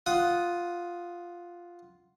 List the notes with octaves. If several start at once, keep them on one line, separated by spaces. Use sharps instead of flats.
F4 F#5 D#6